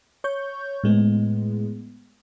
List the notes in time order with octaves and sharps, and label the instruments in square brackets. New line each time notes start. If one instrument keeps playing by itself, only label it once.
[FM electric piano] C#5 C#6 G6
A2 G#3 B3